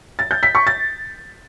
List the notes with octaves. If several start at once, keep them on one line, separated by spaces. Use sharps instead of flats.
A6
G6
B6
C#6
A6